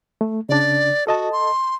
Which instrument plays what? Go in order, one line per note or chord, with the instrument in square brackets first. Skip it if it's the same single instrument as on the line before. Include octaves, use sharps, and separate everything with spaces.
[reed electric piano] A3
[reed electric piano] C#3 D4 [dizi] D5
[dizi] F#4 [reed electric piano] A4 D#5 A5
[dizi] C6